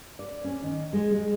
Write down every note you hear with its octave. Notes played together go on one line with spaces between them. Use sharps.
D5
C#4
D#3
G#3
G#3